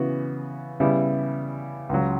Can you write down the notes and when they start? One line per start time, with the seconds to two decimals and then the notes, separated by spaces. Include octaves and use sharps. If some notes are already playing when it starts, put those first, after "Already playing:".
Already playing: C#3 E3 B3 F#4
0.80 C#3 G3 B3 E4
1.89 C#2 C#3 F#3